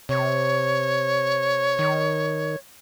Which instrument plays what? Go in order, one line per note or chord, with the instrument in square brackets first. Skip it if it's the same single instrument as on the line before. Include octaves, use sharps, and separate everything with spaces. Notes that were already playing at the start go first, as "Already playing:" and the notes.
[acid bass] C3 [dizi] C#5
[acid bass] D#3